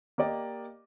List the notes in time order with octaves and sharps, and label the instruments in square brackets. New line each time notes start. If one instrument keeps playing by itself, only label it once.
[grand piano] A#3 G4 D5 D#5